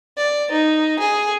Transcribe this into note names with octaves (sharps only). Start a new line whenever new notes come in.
D5
D#4
G#4